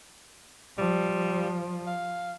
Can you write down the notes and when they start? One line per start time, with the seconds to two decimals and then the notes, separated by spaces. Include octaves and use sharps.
0.78 F3 G3
1.87 F5